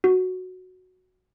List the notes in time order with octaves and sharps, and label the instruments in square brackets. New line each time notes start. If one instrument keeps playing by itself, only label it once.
[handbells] F#4